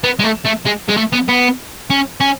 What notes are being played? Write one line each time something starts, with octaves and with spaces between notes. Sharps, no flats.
B3
G#3
A3
A3
G#3
G#3
A3
B3
B3
C#4
C#4